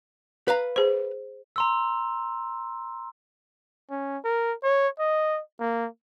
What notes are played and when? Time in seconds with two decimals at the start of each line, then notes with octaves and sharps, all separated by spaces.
0.48 B4 F5 A#5
0.76 G#4 C5
1.56 A#5 C6 E6
3.90 C#4
4.24 A#4
4.63 C#5
4.99 D#5
5.60 A#3